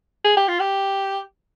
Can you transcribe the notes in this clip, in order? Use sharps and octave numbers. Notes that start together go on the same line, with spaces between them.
G#4
G4
F4
G4